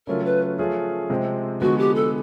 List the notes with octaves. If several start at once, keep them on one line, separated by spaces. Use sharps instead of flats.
C#3 F#3 A3 C#4 F4 A#4
B4
F3 A3 C#4 F4 G#4
C3 F3 G#3 C4
D3 F3 G#3 B3 F#4
G4
A4